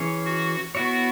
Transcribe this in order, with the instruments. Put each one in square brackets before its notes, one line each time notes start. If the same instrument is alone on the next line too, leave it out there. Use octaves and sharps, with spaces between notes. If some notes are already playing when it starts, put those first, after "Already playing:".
Already playing: [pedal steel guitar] E3 C#4 G#4 C#5
[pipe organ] F#4
[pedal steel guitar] B3 E4 C#5 [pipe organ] F#4